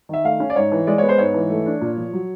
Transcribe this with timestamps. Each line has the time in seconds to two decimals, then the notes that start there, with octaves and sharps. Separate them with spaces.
0.09 D#3 E5
0.24 A3 F5
0.40 C#4
0.50 D5
0.56 G#2 C#5
0.72 E3
0.87 G#3 D5
0.98 B3 C#5
1.09 C5
1.18 G#2 C#5
1.34 E3
1.50 A3
1.66 D4
1.81 A#2
1.97 F3
2.13 F#3